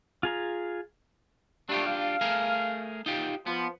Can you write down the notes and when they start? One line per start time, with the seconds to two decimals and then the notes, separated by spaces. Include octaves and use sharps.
0.23 F4 G#4 A#5
1.69 G3 A3 D4 F4 G4
1.86 F5
2.21 A3 G#4 A#4
3.06 D#4 F4 G4
3.47 F3 B3